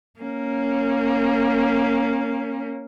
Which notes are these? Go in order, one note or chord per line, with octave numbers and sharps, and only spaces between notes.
A#3 C#4